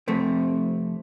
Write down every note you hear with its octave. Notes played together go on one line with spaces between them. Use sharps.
F2 C3 A3